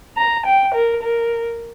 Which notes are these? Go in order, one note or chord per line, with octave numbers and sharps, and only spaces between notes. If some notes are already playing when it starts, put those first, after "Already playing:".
A#5
G5
A#4
A#4